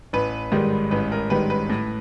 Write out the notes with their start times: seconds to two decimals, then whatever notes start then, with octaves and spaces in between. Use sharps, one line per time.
0.13 A1 B4
0.52 G#2 D#3 G3
0.91 A1 B4
1.12 A#4
1.30 G#2 D#3 G3 B4
1.50 B4
1.69 A2